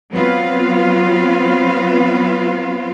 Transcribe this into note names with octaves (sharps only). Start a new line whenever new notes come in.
F#3 B3 C4 F4 B4 F5